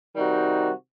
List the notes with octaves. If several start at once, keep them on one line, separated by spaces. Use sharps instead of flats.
C3 D#3 G3 D#4 F#4